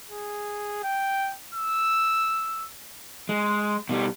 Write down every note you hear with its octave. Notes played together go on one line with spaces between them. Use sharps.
G#4
G5
E6
G#3
B2 G3